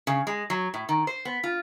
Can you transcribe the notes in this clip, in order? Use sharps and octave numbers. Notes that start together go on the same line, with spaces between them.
C#3
G#3
F#3
A2
D#3
C5
B3
F4